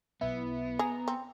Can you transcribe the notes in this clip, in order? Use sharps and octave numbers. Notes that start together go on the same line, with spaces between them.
B1 B3 E4
G#4 A#5
C4